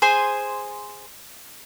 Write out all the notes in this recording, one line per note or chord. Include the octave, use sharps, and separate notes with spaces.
G#4 C5 G#5 C6